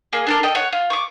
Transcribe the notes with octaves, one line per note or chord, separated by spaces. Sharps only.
A#3 G#4
D4 A4 A#4
A4 D#5 G5
C#5 F#5
F4
C#6 D6